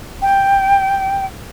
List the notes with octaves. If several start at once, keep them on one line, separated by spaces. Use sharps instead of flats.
G5